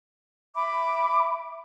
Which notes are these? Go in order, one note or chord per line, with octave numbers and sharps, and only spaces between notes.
E5 B5 D6